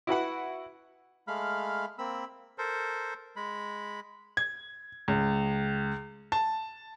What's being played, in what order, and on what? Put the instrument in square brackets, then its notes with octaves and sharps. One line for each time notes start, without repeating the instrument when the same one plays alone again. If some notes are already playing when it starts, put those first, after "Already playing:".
[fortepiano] E4 F#4 B4 F#5
[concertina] G#3 A3 F5 B5 F6
A#3 C4 B5 E6
A4 A#4 C5
G#3 B5
[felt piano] G#6
C#2
A5